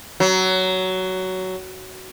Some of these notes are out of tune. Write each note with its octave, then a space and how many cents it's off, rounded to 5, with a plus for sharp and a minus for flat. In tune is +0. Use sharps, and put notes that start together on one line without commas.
F#3 +15